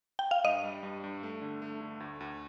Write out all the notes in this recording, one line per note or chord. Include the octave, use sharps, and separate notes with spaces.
G5
F5
G2 D#5
G3
G2
G2
A3
D3
A3
D3
D2
D2